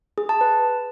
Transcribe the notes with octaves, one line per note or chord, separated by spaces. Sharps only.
G#4
A5
B4